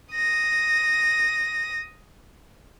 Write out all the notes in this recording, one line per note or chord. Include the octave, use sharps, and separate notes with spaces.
D#6 A#6